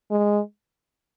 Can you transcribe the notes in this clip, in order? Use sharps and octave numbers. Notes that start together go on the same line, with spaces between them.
G#3